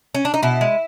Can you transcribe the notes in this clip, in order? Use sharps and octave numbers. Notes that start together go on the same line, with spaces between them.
C#4
D4
D#4
B2 E4
G#3